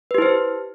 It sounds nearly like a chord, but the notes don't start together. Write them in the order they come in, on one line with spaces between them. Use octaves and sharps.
B4 G4 E4 C5